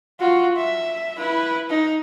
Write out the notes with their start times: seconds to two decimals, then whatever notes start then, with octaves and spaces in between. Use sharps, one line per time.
0.20 F4 F#4
0.57 E5
1.18 E4 B4
1.70 D#4